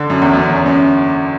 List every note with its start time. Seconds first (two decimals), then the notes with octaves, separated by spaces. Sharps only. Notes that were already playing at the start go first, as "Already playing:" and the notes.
Already playing: D3
0.10 F#2
0.22 E2
0.33 F#2
0.50 E2
0.66 F#2